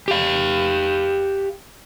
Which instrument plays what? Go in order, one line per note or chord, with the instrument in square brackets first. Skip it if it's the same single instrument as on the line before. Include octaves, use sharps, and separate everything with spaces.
[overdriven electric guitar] G4 F5